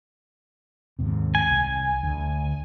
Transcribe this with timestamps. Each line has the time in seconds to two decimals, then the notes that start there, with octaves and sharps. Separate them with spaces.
0.99 D#2 G#2 C3
1.35 G#5
1.51 C2
2.03 D2